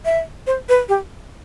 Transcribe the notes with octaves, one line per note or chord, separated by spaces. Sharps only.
E5
C5
B4
G4